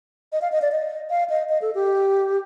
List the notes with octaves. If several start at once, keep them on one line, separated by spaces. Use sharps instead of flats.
D#5
F5
D#5
D5
D#5
F5
D#5
D#5
A4
G4